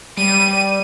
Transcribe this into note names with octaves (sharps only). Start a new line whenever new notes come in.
G3 D#7